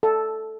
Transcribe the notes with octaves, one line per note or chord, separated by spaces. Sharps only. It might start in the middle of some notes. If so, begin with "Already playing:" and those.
A4